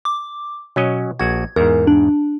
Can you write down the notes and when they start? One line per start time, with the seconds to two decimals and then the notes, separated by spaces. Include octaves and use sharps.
0.05 D6
0.76 B2 F#3 C#4 D#5
1.19 A#1 F#4 G#6
1.56 E2 G#2 A#4
1.87 D4